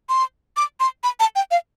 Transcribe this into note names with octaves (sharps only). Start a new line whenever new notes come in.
C6
D6
C6
B5
A5
G5
F5